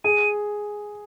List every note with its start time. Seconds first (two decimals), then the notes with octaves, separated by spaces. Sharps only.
0.04 G#4 D#7